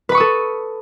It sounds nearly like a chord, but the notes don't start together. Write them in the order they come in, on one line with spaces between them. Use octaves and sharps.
B4 B5 C#6 D#6 A4